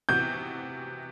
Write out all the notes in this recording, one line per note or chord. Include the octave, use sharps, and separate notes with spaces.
C3 E3 B3 F#4 G6